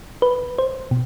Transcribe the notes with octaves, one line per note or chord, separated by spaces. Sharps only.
B4
C5
B2